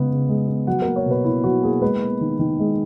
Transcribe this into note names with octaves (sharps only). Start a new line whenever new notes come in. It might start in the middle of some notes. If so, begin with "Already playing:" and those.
Already playing: C#3 G#3 B3
C#3
G#3
B3
F#3 F#5
A#3 A#4
C#5
B2 B4
B2 E4
F#3 F#4
A#3 G#4
G#3 B4
B3
D#3
D#3
G#3